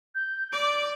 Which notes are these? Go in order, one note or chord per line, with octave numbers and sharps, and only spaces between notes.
G6
D5 D6 D7